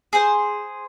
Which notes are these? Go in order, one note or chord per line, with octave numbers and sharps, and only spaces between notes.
G#4 C5